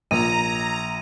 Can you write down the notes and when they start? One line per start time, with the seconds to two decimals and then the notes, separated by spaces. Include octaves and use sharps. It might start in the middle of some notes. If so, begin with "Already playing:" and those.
0.11 A#1 A#5 D#7